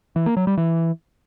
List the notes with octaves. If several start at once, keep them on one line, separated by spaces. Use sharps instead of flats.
E3
A#3
F#3
G3
E3